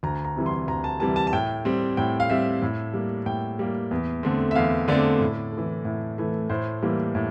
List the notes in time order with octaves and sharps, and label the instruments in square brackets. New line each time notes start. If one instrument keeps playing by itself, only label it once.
[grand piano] D2 A#5
A#5
C3 E3 G3
C6
D2 A#5
A5
C3 E3 G3 A5
A5
A5
A2 G5
G3 C4
A2 G5
F5
G3 C4 E5
A2
G3 A#3
A2 G5
G3 A#3
E2
D3 A3 C4
E5
E2 F5
D3 A3 C4 D5
A2
A3
E3
A2
E3 A3
A2 C5
E3 G3 A#3
A2